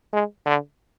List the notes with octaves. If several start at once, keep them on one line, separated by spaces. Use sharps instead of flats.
G#3
D3